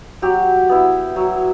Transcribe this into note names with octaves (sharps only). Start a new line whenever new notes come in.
F#3 G4
B3 E4
F#3